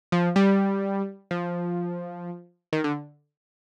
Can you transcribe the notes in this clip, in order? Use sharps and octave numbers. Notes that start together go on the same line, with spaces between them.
F3
G3
F3
D#3
D3